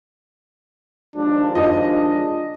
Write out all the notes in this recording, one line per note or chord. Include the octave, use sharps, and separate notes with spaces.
D#2 F3 G#3 D4
D4 F4 D#5